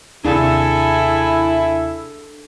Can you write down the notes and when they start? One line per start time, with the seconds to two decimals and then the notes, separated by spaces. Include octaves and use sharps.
0.24 D#2 C3 D4 E4 G#4 A4 F5 G#5